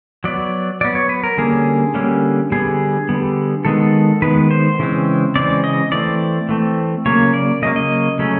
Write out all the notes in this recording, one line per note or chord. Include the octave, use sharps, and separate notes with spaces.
F#3 B3 D5
F#3 B3 D5
C#5
B4
A#4
D3 G3 A#3 C#4 G#4
D3 G3 A#3 C#4
D3 G3 B3 G#4
D3 G3 B3
D#3 G#3 B3 A4
D#3 G#3 B3 B4
C5
C#3 E3 G#3 C4
C#3 E3 G#3 C4 D5
D#5
E3 A3 C4 D5
E3 A3 C4
C#3 F#3 A#3 C#5
D5
C#3 F#3 A#3 D#5
D#5
C#3 F#3 A3 C#4